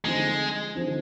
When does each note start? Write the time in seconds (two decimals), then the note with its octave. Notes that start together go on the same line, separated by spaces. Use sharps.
0.05 D3 F3 G#3 C4 D#4
0.75 D3 F3 C4 D#4